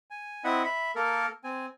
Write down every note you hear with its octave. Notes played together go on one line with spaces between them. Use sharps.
G#5
C4 E4 D#5 E5 F#5
E5 B5
A#3 A4 A#4
C4 G#5